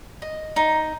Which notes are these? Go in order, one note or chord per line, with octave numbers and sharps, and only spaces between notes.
D#5
D#4